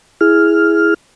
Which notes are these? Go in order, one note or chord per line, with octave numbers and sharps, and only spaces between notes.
E4 G#4 F6